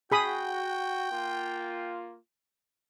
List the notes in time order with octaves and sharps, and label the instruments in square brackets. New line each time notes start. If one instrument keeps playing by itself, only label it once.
[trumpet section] F#4 [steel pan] G#4 B5 D#6 [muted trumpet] G5
[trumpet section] A#3 F4